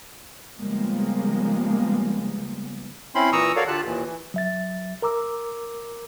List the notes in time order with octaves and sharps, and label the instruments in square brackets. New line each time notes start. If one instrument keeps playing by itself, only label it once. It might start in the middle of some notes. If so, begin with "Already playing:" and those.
[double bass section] C#3 F3 G3 G#3 A#3 B3
[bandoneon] C4 C#4 E4 B5 C6
A#2 E3 A#5 C#6 D#6 E6
F#4 A4 A#4 C#5 D5 F5
D3 F4 G4 A5 F#6
D#2 A#2 E3
E3
[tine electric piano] F#3 E5 A6
A#4 A#5 D6 E6